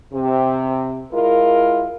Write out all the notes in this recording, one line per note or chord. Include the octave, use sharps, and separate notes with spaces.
C3
G#3 E4 F4 A#4